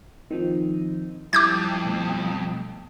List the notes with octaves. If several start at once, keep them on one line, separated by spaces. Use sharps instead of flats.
D#3 F3 C4 D#4
F2 G3 E4 D6 G6 G#6
B2 G3 A3